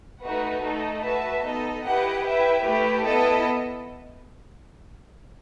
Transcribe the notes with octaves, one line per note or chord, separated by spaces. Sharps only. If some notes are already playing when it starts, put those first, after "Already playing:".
A3 D#4 F#4 B4 F#5
A3 D#4 A4 D#5
F#4 B4 E5 A5
B3 D#4 A4 D#5
E4 G4 B4 D#5 F#5
E4 B4 E5 G5
A3 E4 G4 B4
B3 E4 A4 D#5